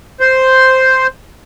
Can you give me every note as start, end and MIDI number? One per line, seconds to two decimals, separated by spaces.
0.20 1.07 72